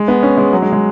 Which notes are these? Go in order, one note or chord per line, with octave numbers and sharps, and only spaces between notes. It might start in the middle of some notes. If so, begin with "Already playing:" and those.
Already playing: G#3
B3
C#4
G#3
F#3
G#3
G#3